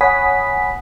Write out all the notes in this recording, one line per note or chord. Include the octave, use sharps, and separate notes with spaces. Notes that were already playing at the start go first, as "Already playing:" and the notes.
C#5 F#5 G#5 B5 D#6 B6